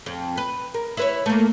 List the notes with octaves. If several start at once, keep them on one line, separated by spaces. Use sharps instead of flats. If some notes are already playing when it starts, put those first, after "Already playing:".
F2
B4
A#4
E4 B4 C#5
A3 A#3